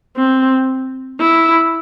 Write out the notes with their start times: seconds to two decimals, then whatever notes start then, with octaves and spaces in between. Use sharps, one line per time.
0.16 C4
1.21 E4